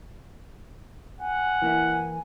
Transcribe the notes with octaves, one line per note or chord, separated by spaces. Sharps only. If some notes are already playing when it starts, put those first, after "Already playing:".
F#5 G#5
E3 A#3 E4